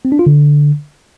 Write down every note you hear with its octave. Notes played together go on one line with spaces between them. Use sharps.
C4
D4
F4
D3